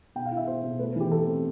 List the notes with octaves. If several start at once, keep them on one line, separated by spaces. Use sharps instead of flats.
B2 G5
F5
E4
E5
B2 C5
B2
A3 B4
E3 G4
A3 A4
C4